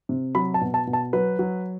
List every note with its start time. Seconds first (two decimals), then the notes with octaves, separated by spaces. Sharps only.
0.09 C3
0.35 F#3 B5
0.54 A5
0.61 B2
0.74 A5
0.87 B2
0.93 A5
1.13 F#3 B4
1.39 F#3